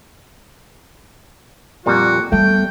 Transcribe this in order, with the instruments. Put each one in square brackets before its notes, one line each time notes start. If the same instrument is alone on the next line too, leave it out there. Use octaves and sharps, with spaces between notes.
[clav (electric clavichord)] F2 A#2 G3 [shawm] F#4
[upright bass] G3 B3 [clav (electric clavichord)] A3 [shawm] G5